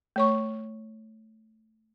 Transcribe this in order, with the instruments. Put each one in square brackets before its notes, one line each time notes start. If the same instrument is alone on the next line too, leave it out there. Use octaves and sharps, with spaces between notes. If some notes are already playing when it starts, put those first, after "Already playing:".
[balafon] A3 C#5 C#6